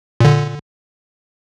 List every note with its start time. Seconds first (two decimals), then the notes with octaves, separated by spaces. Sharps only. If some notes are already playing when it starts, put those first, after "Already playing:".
0.20 A#2 D3